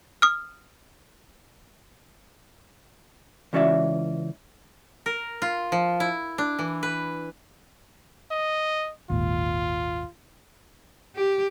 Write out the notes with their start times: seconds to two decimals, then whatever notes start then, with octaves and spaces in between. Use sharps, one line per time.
0.22 D#6 F6
3.53 C#2 E3 C#4 F#4 D5 E5
5.06 A#4
5.42 F4
5.72 F3
6.00 E4
6.38 D4
6.59 E3
6.83 B4
8.31 D#5
9.10 G#1 D#2 A#2 F4
11.16 G4